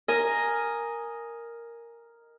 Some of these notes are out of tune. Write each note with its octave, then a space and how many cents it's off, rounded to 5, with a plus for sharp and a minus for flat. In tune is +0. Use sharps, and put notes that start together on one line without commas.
A#4 +0 D#5 +0 G#5 +0